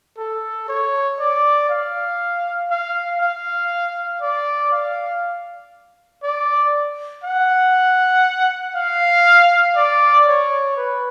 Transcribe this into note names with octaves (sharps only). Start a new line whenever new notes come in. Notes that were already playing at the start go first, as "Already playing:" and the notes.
A4
C#5
D5
F5
F5
F5
D5
F5
D5
F#5
F5
D5
C#5
B4